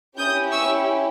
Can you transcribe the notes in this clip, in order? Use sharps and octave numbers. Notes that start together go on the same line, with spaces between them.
C#4 E4 G4 D#6 G6
C#6 E6